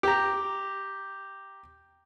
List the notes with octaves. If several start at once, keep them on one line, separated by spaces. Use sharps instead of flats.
G4 A#5